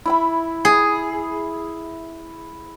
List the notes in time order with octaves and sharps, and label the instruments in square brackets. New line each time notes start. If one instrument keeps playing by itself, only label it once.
[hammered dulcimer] E4 E5 B5
[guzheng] G#4